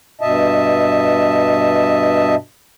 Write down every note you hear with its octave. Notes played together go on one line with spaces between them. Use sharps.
G2 B2 D#5 E5 A5